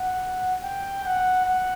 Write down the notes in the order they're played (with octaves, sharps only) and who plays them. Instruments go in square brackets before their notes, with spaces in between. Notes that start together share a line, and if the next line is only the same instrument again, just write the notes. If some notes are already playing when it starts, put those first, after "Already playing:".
Already playing: [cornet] F#5
G5
F#5
F#5